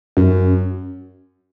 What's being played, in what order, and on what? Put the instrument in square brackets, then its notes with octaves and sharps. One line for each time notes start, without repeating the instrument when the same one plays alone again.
[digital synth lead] F#2